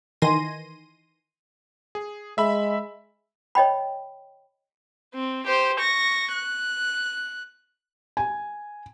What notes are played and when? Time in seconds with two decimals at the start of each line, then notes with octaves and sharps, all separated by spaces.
0.22 D#3 E3 G#5 C6 A#6 D#7
1.95 G#4
2.38 G#3 E5 B5
3.55 C#5 D#5 G5 B5
5.14 C4
5.47 G4 C5
5.80 C#6 A#6
6.33 F#6
8.17 G#5